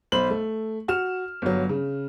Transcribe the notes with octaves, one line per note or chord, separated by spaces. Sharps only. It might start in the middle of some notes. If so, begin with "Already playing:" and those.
B1 C5 B5 F#7
A3
F#4 F6 E7
G1 F#3
C#3